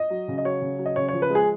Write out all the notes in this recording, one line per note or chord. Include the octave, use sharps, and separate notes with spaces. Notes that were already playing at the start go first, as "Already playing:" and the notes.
Already playing: D#5
F#3
C#3
D#5
F#3 C#5
C#3
F#3
D#5
C#3 C#5
F3 C#5
B4
G#3
G#4